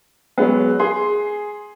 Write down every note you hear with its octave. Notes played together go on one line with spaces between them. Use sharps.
F#3 G#3 B3
G#4 C6